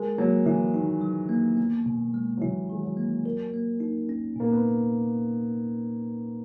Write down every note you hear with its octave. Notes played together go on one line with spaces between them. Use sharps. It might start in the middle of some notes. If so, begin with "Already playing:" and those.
Already playing: G#3 A#4
F#3 A#3
E3 E4
D#3 D#4
F#3
A#3
B3
B2
G#3
F#3
E3 E4
D#3 G#3
F#3
A#3
A#4
A#3
D#4
C#4
A#2 A#3
B3